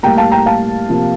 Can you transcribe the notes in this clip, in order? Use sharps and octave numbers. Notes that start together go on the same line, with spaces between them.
A2 G3 A#3 G5 A#5
F5 A5
G5 A#5
F5 A5
C3 F3 A#3